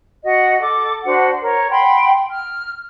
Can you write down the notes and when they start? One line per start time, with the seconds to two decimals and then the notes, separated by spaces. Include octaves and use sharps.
0.24 F#4 D#5 F#5
0.62 A4 D6
1.05 D4 F#4 C5 F#5
1.42 A#4 C#5
1.71 F#5 G5 B5 C6
2.31 F6